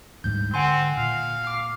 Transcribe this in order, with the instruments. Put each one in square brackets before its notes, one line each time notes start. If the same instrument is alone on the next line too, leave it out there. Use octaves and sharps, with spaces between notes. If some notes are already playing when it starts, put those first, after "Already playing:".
[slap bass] D2 G#2 G3 [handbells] G6
[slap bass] D3 [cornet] C4 [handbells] F#5 G#5 C6
[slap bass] A#2 [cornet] F5
[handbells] D6 F6